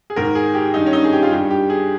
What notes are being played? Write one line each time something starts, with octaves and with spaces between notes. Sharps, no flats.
G#4
G#2 D#3 A#4
G#4
G4
G2 D#3 D#4
C#4
D#4
G#4
G4
F4
G2 D#3 G4
G4
G#4